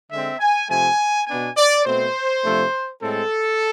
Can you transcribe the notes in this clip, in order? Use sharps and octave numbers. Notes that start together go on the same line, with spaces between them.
D3 G#3 C4 E5
G#5
C3 F3 A3 G#5
B2 B3 D4 G#5
D5
B2 A3 C4 C5
C3 F3 A3 D4
A2 G#3 C4 A4